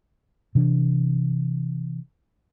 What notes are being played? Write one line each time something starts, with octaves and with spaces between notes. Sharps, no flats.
C3 E3 D4